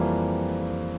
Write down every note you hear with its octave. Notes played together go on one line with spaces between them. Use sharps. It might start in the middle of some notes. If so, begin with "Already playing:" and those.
Already playing: F2 E3 G3 A#3